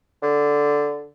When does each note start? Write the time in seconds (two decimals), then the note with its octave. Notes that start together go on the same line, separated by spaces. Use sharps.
0.22 D3